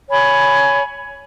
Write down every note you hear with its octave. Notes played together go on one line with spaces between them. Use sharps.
C#5 G#5 B5